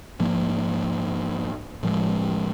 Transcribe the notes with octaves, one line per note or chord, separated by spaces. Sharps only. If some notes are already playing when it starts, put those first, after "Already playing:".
G#2 F3 A#3
A2 F3 G#3